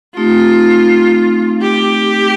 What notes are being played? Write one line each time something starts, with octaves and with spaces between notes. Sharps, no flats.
A3 C4 D#4 F4 G4
G4